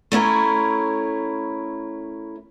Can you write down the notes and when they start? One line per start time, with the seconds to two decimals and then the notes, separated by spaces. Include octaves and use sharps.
0.12 A3 C#4 E4 A#4